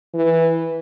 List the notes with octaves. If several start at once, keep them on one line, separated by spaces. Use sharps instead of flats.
E3